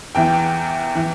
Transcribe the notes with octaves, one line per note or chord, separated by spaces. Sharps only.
E2 E3 G5
E3